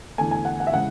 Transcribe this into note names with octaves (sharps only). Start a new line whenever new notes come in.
E2 D3 A3 G#5
G#5
F#5
F#5
E5
C#3 E3 G#3 F#5